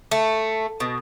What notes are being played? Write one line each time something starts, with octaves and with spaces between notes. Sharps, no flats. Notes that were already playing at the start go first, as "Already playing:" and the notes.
A3
B2